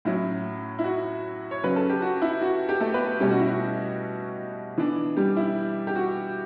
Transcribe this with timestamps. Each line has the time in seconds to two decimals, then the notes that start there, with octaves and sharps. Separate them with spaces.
0.05 A2 F#3 C#4 E4
0.79 E4
0.84 F#4
1.51 C#5
1.63 C#3 F#3 C#4 B4
1.76 A4
1.89 G4
2.02 F#4
2.22 E4
2.42 F#4
2.69 G4
2.80 A3 A4
2.94 B3 B4
3.20 B2 G3 A3 C#4 G4
3.30 F#4
3.40 E4
3.50 F#4
4.78 E3 B3 D4
5.16 G3 G4
5.36 E4
5.87 G4
5.95 F#4